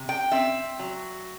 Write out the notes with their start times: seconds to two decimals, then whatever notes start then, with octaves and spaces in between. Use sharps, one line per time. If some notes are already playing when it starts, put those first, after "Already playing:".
Already playing: C3
0.09 G5
0.32 C4 E5
0.80 F#3